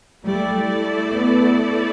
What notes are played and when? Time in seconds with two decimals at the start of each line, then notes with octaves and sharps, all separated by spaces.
0.25 G3 A3 E4 A4 D5
1.13 B3